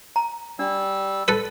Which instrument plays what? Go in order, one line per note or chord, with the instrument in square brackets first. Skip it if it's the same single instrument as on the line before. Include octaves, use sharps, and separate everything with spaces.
[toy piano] A#5
[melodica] G3 E6 [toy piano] D4
[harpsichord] A4 B4